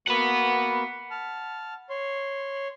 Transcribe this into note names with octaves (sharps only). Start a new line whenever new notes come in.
A#3 B3 F#4 F#5 B5
A5 F6
C#5 C6